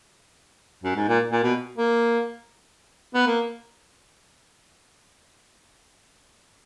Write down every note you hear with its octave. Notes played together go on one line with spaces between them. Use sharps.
F#2
G#2
A#2
A#2
B2
A#3
B3
A#3